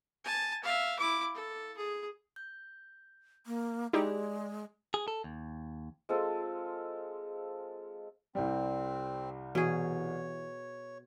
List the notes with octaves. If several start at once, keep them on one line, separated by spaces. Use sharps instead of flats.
G#5 A5
E5 F5
E4 D6
A4
G#4
G6
A#3
G#3 D#4 E4 G4 G#4 D5
G#4
A4
D#2
G#3 C4 F4 A4
C2 G3 C4
B2 E3 G#4 C#5